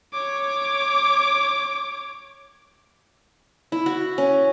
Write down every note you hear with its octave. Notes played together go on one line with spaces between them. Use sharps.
C#5 D6
E4
F#4
C#4